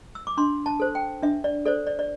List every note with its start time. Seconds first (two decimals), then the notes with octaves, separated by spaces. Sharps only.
0.15 E6
0.27 D6
0.37 D4 C6
0.66 A5
0.80 A4 C5
0.95 G5
1.22 D4 E5
1.44 D5
1.65 A4 C5 D5
1.87 D5
1.99 D5